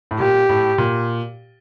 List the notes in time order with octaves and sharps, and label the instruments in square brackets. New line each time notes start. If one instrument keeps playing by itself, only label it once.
[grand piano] A2
[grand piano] A#2 [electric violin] G4
[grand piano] A2
A#2